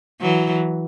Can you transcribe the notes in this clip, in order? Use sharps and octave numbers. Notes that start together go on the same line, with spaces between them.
E3 F#3